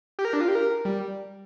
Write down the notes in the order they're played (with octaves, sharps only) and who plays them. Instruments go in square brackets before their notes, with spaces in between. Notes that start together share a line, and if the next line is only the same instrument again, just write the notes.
[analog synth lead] G4
A#4
D4
F4
G4
A#4
G3